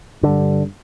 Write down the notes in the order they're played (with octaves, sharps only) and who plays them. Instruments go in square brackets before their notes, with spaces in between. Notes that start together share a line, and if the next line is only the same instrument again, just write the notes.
[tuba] G2 [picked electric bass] D3